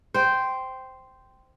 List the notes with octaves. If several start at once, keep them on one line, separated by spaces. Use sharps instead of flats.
C5 G5